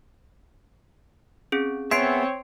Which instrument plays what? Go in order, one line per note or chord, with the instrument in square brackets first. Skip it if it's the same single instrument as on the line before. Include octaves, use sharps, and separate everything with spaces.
[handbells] C4 C#4 G#4
[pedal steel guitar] B3 G#4 E5 [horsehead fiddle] C4 C#5 [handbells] C6 C7 D7